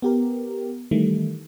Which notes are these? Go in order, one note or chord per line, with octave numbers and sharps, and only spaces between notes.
B3 G4 A#4
D#3 E3 G3 A3